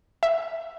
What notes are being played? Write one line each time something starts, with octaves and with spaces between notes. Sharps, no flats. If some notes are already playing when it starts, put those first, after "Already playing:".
E5